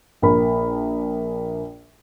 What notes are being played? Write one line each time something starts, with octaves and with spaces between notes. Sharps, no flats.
A#1 A#4 B5